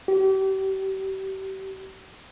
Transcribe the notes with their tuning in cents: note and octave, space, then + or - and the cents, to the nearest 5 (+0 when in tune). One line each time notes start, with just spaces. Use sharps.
G4 -35